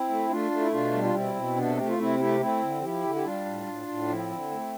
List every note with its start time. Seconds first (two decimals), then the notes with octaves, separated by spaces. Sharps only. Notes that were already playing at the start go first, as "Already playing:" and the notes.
Already playing: C4 E4
0.09 A3
0.30 A3 D4 F4
0.51 A3
0.60 E4
0.71 B2 D4 F4
0.93 G3
1.04 F4
1.14 B2 C4 E4
1.35 B2
1.56 C3 B3 D4
1.66 A4
1.77 A3 G4
1.88 F4
1.98 C3 C4 E4
2.19 A3 E4 G4
2.40 A3 C4 E4
2.62 D3
2.82 F3 E4 G4
3.04 D3
3.15 G4
3.24 G3 D4 F4
3.45 A2
3.67 A2
3.87 A2
4.09 F3 C4 E4
4.30 D3
4.51 A3